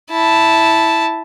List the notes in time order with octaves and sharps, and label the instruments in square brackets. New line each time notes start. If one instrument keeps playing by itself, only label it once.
[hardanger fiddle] E4 A5